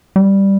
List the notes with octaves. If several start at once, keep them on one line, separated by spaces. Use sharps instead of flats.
G3